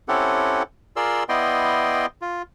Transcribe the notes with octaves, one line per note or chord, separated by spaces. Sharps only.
C4 C#4 E4 G4 A4 F#5
F4 G#4 A#4 D5 C6 E6
B3 E4 D5 D#5 G5 C6
F4